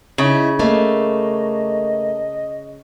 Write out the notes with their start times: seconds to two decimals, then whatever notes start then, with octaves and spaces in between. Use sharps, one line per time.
0.18 C#3 D#4 E4
0.59 A3 A#3 D#5